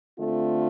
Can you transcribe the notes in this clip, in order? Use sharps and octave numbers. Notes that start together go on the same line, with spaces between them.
D3 A3 C4 F4